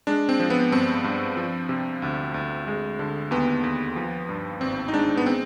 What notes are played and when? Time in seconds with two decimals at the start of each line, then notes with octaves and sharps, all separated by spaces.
0.07 G#3 D4
0.29 C4
0.40 F3
0.50 B3
0.72 G2 C4
1.04 G2
1.37 F3
1.69 C3
2.02 D2
2.34 D2
2.67 G#3
2.99 D3
3.31 D#2 B3
3.64 D#2
3.96 F3
4.29 G2
4.61 G#1 C4
4.88 D#4
4.93 G#3 D4
5.17 B3
5.26 G#3 C4